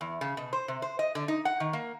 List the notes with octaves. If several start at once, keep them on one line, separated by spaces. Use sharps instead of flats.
E2
C#3
B2
C5
C3
C5
D#5
D3
D#4
F#5
D#3
A#3